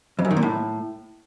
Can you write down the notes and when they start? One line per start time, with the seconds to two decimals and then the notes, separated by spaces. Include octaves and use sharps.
0.19 F2
0.25 F#2
0.31 D#3
0.37 A#2
0.43 A2